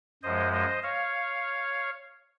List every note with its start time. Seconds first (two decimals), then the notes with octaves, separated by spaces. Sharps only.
0.23 F#2 F3 G#3 C5 D#5
0.53 C5 D#5
0.83 C#5 F5